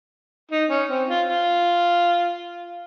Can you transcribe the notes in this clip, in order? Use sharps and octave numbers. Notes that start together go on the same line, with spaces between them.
D#4
C#4
C4
F4
F4